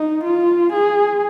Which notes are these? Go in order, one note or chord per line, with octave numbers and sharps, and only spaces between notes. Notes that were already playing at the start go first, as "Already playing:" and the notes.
Already playing: D#4
F4
G#4